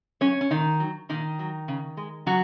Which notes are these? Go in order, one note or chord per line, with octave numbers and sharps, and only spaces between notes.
F#3 C#4 C#5
C#4
A#2 D#3 D#4
F#3
A#2 D#3 D#4
F#3
C#3
G#3
C#3 F#3 F#4